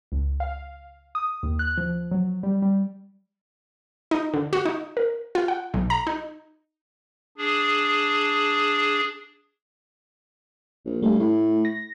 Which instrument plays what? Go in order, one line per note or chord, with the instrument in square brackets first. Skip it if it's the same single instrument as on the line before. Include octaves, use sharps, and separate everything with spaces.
[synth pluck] C#2
F5
D#6
D#2
F#6
F3
F#3
G3
G3
[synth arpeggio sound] D#4
D3
F#4
D#4
A#4
F4
F#5
B1
A#5
D#4
[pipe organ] D4 G#4
[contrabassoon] A#1
[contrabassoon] G2 [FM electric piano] A3
[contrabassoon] A2
[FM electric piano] A#6